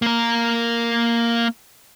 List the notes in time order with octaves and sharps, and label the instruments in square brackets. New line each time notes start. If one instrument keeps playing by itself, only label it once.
[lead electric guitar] A#3 A#4